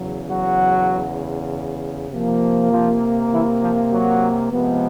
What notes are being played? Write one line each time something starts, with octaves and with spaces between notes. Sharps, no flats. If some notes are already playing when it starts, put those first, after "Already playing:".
Already playing: E2 C#3 F#3
F#3 F#4
C3 F3 A#3
F3 F4
E3 E4
F3 F4
F#3 F#4
C3 F3 G#3 B3